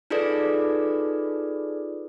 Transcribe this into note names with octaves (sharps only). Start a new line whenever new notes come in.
D#4 F4 G#4 A4 B4 D5